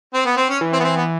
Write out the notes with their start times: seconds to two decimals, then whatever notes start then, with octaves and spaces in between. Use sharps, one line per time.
0.14 C4
0.25 B3
0.37 C4
0.49 C#4
0.61 E3
0.73 C4
0.80 B3
0.84 C4
0.96 B3